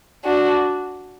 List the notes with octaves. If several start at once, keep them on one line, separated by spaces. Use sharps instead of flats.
D4 F#4